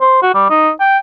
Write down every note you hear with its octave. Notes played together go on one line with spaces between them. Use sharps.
C5
F#4
G3
D#4
G5